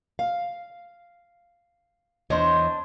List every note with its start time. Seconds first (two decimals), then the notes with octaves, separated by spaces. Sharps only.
0.19 F5
2.30 E2 D4 C5 C#5 D#5